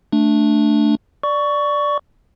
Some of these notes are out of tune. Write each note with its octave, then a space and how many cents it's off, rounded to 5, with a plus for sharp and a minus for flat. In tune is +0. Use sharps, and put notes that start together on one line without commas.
A3 +0 D4 +0
D5 +0 C#6 +15